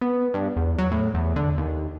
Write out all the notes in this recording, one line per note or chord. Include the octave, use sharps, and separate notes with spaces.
B3
G2
E2
F#3
A2
E2
D3
D#2